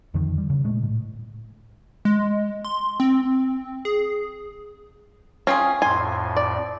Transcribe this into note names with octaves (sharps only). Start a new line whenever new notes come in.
F2 D3 D#3 F3
G3
C#3
A#2 G#3 A3
A2
G#3
C6
C4
G#4
C4 C#4 F4 G#4
F2 A2 G#5 C6
D5